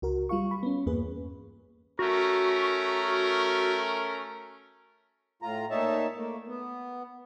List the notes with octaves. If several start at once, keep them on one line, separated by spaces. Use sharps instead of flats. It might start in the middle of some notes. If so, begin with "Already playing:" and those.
C#2 F#4 A#4
G3 F4 F5 C#6
B5
B3 C#4
E2 G2 A#3 G#4 B4
A3 C#4 F#4 A#4
A2 F4 A#5
A#2 D#4 C#5 E5 A5
A3 A#3
B3